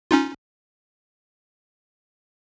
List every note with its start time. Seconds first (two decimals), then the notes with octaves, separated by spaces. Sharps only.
0.11 C#4 D#4 F4